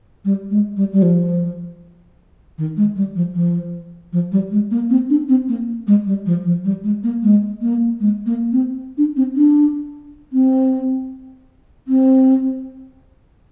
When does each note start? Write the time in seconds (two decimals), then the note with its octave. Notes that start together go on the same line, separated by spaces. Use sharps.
0.25 G3
0.51 G#3
0.77 G3
0.93 G3
1.02 F3
2.58 D#3
2.77 G#3
2.96 G3
3.16 F3
3.35 F3
4.13 F3
4.32 G3
4.52 G#3
4.71 A#3
4.90 C4
5.10 D4
5.29 C4
5.49 A#3
5.87 G#3
6.07 G3
6.26 F3
6.45 F3
6.64 G3
6.84 G#3
7.04 A#3
7.23 G#3
7.61 A#3
8.00 G#3
8.26 A#3
8.52 C4
8.98 D4
9.17 C4
9.36 D4
10.33 C4
11.88 C4